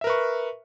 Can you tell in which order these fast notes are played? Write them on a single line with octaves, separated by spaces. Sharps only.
E5 A#4 B4 C#6